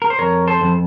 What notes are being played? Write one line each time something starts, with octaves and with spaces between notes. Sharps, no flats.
A#4
C5
F2 A#4 C#5
A4 C5
F2